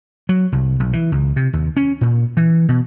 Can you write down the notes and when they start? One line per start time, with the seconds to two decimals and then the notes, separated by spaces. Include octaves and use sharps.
0.29 F#3
0.52 C2
0.80 B1
0.93 E3
1.12 C#2
1.36 C3
1.53 D#2
1.77 C#4
2.01 A#2
2.37 E3
2.69 B2